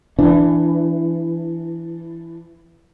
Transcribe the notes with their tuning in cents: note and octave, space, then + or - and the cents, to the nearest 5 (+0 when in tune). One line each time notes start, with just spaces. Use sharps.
E3 +15 D4 +0